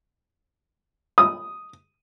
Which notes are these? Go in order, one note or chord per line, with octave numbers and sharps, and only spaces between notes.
D#6